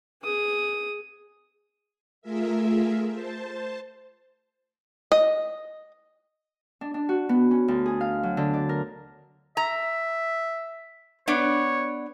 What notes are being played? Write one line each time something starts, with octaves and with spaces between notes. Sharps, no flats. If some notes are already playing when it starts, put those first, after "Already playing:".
G#4 D#6
A3 F4 G#4 A#4 E5
C5 A5
D#5
D4
D4
F#4
B3
C#4
D2
G#4
F5
F#3
D3
D5
A#4
E5 A#5
B3 D4 C#5